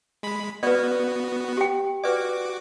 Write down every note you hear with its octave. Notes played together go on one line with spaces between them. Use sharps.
G#3 B5
B3 F#4 B4 D5
G4 G5
F#4 B4 D5 D6